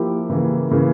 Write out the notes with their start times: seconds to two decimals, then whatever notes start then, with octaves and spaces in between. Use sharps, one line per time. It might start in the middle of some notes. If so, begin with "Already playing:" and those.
Already playing: F3 A#3 E4 G4
0.30 C#3 E3 A#3
0.71 C#3 E3 A#3